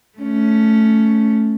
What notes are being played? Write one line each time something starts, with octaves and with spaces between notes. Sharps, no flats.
A3 C#4